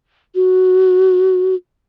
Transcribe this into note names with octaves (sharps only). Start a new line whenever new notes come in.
F#4